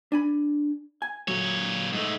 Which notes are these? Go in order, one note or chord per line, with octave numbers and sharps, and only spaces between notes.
D4 G#5 B5
G#5
A#2 F#3 C#5
G#2 A3